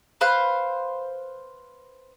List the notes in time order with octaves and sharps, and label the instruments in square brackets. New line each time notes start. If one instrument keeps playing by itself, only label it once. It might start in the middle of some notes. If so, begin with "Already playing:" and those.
[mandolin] B4 C5 F5 F#6